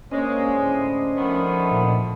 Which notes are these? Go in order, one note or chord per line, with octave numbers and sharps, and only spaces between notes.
G#3 A#3 C#4 D4 C5 C#5 D#5
D2 A2
B2 D#3 F3 A3 B3
A#2